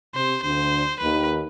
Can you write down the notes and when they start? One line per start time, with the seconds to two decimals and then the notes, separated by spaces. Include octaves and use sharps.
0.14 C3 C5
0.43 D2 D3 C5
1.00 D#2 D#3 B4